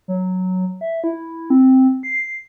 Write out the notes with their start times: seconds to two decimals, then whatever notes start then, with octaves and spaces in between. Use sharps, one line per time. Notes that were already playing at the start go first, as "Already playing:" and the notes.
0.08 F#3
0.81 E5
1.04 E4
1.50 C4
2.03 C7